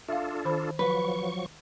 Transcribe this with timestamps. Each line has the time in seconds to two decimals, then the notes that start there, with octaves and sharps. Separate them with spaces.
0.08 D4 F4 A4 E5 F5
0.45 D#3 C5 B5
0.79 F3 F#3 B4 C#6